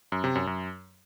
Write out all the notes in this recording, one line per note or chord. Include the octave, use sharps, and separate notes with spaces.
F#2
C3
F#2
F#2